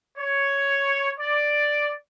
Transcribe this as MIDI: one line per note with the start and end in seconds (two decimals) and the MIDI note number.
0.18 1.12 73
1.19 1.92 74